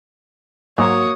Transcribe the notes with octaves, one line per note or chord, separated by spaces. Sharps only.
G#2 F#3 A#3 F#4 C#5 D#6